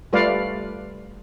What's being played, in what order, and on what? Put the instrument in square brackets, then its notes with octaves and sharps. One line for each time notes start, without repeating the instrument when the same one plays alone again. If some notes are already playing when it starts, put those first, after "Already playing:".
[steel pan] G3 A3 F4 B4 D5 F5